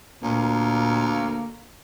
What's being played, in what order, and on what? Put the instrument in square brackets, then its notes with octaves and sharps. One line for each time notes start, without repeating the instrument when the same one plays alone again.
[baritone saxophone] D2 [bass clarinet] A#2 [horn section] A#3